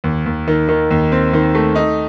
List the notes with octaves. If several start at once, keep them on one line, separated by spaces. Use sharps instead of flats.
D#2
D#2
D#3
D#3
D#2
C4
D#3
A3
D#4